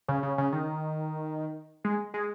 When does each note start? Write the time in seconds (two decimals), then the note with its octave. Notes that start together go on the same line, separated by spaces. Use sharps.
0.08 C#3
0.23 C#3
0.38 C#3
0.52 D#3
1.84 G#3
2.14 G#3